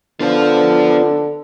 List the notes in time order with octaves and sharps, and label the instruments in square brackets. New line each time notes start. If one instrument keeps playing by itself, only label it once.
[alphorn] D3 [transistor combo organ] B3 D4 [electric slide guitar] F4 C5 F5